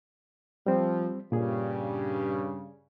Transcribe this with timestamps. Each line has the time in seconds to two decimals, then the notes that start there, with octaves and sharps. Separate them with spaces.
0.66 F3 G3 C4
1.32 G2 A#2 C#3 G3 G#4